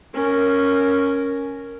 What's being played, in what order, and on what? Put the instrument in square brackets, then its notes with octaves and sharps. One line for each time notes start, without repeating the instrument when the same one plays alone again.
[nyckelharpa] C#4 A#4